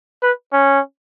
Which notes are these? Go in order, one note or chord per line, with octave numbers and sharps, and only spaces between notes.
B4
C#4